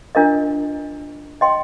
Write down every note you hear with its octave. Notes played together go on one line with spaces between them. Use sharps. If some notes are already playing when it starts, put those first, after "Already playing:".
D4 F4 A#4 D#5
C5 D#5 G5 C6